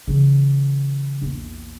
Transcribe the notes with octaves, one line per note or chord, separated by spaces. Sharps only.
C#3 E3
A#1 E2